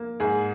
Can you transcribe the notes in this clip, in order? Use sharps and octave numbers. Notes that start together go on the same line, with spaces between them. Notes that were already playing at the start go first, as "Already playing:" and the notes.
Already playing: A#3
G#2 G#4